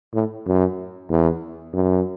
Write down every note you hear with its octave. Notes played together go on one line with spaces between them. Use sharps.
A2
F#2
E2
F#2